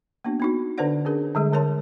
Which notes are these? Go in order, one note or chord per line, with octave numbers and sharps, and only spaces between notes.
A#3 B3 D4 F#4
B3 D#4 F#4
D3 D4 B4 C5 D5 F#5
C#4 D4 G#4 A#4
D3 G3 G#3 G#4
D3 A#4 C#5 A5 C6